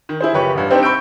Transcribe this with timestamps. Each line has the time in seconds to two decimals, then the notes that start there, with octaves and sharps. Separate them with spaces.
0.09 D#3
0.20 E4 G#4 C5
0.33 F#1 F3 G4 B4 C#5 C#6
0.54 A1 G2
0.71 C4 D4 D#4 G4 C5
0.83 B5 C#6 E6 G6 D7